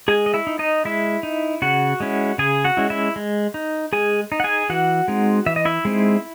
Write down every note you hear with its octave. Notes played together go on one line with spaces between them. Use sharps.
G#3 G#4 G#5
D#5
E4 E5
D#4
D#4 D#5
G#3 E4 E5
D#4
C#3 F#4 F#5
G#3 C#4 E4
C#3 G#4 G#5
F#4 F#5
G#3 C#4 E4
E4 E5
G#3
D#4
G#3 G#4 G#5
D#4
F#5
G#4 G#5
E3 F#4 F#5
G#3 C4 D#4
E3 E5
D#5
E4 E5
G#3 C4 D#4